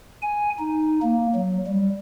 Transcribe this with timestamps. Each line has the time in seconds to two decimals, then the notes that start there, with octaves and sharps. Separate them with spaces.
0.22 G#5
0.59 D#4
1.03 A#3
1.35 F#3
1.67 G3